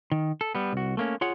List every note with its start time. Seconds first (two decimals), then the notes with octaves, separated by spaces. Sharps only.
0.12 D#3
0.41 A4
0.55 G3 B3
0.73 C2 F#4
0.97 A3 A#3 C#4
1.21 F4 G#4 C#5 F#5